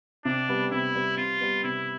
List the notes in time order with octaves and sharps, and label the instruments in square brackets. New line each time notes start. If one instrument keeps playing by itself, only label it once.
[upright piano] C3 [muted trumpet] D4
[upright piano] G3 B3
[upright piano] C3 [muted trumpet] E4
[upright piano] G3 B3
[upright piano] C3 [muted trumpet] F4
[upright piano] G3 B3
[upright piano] C3 [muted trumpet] E4